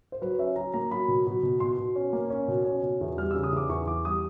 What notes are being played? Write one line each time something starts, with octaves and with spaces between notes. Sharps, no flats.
C5
F#3 B4
C#4 E5
F#3 A#5
A#3 A#5
F#3 B5
B2
B2
B2
B2 C6
B2
C#4
A#3
C#4
B2
C#4
B2
E2
G3 F6
C#3 E6
D#6
E2 D6
E2 C#6
E3 D6
G3 D#6